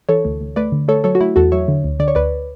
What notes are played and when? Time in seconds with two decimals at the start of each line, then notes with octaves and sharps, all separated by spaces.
0.09 E3 A4 C#5
0.25 D2
0.40 D2
0.56 A3 B4 D5
0.72 D3
0.88 A3 A4 C#5
1.04 F#3 A4 C#5
1.15 F#4
1.20 A3 E4
1.36 E2 F#4 A4
1.52 F#3 C#5 E5
1.68 D3
1.84 D2
1.99 D3 D5
2.08 C#5
2.15 D2 B4 D5